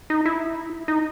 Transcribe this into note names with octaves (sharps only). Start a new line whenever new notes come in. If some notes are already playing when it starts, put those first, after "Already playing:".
D#4
E4
D#4